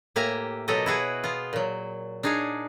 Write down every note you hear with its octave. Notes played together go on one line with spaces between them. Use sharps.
A2 A#3 G4 E5 G#5 A#5
B2 F#3 G4 A4 D#5
E4 F#4 G#4 B4
B3 F4
A#2 F#3
D4 D#4 G#4 C#5 F5